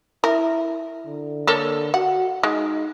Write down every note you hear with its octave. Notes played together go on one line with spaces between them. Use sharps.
E4 A#4
D3
A#3 A4 C#5
F#4 F#5
G#3 D#4